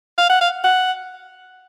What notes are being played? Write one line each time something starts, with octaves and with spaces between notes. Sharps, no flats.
F5
F#5
F5
F#5